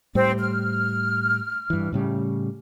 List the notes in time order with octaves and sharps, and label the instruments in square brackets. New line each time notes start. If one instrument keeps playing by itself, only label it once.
[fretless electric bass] A2 G3 [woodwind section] C4
[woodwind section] F6
[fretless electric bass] G2 E3
A2 C#3 G3